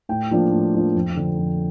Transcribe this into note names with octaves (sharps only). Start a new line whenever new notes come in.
A2 G5
F3 A#3 D4 F4
A2
F3 A#3 D4 F4
F2
D3 F3
F2